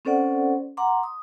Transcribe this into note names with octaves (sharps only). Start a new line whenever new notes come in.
C4 C#4 A4 C5 D5 F#5
F#5 A#5 C6 D6
D#6